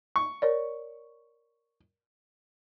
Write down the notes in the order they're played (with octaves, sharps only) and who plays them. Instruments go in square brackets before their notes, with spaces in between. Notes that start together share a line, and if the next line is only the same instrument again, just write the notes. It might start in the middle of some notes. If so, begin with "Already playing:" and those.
[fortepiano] C#6
[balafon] A#4 C#5 D5